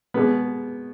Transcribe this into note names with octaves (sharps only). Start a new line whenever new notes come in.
B2 G#3 B3